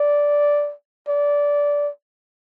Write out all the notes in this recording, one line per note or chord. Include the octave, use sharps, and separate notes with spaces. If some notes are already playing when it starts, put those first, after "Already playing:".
Already playing: D5
D5